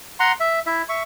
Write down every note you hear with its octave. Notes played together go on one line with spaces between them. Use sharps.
F#5 A#5 C6
E5
E4 E5
E5 C#6